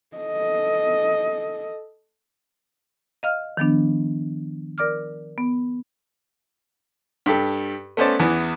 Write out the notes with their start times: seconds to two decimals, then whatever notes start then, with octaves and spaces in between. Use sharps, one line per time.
0.16 A4 D#5
3.23 D#5 F5 F6
3.57 D#3 F3 B3 D4
4.78 A#4 D5 D6 F6
5.38 B3
7.26 G2 G4 A4
7.97 A3 B3 C#4 C5 D5 A5
8.19 E2 E3 B3